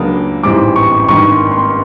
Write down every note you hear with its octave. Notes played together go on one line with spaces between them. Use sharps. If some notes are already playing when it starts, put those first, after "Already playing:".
Already playing: C#2 C#3 F#3 A#3 D4 D#6
A1 G#2 E3 G3 C4 D6
C#6
G#1 G2 D#3 C#6
C6
C6